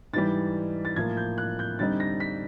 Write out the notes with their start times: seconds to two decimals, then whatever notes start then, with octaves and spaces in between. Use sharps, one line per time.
0.13 G#2 E3 G3 A6
0.85 A6
0.96 A2 F3 A#3 G#6
1.17 G6
1.38 F#6
1.59 G6
1.79 D3 G3 C4 D#4 A6
2.00 A#6
2.20 B6